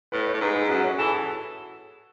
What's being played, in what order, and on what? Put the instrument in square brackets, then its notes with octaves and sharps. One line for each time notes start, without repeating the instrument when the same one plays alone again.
[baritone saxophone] A2 [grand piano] B4
[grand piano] C#5
[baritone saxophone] A2
[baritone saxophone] G#2 [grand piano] B4
[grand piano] G#4
[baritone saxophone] F#2 [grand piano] F#4
[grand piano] C#5
G#4
[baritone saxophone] E3 [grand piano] A4
[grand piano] G#4